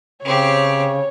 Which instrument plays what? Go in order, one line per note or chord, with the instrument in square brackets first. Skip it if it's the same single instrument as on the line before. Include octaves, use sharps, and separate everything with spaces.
[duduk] C#3 [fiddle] C4 G4 [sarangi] C#5